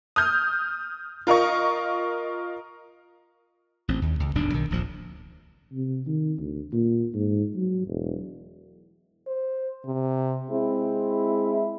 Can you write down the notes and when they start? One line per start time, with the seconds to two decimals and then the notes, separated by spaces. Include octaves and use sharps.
0.16 D#6 F6 G6
1.27 F4 A#4 D#5 C#6
3.88 A1 C4
4.02 D#2
4.20 C#2
4.35 D1 B1 G#2 D4
4.54 B1 D#3
4.70 D1 A#1 F3
5.73 C3
6.07 D#3
6.38 D2
6.73 A#2
7.14 G#2
7.56 F#3
7.88 E1
9.27 C5
9.86 C3
10.51 G#3 C4 E4